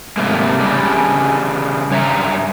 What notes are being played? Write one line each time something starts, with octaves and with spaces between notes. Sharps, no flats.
G#2 C3 F#3 G3 A3 A#3
C#3 G3 D4
G2 C#5 E5 A#5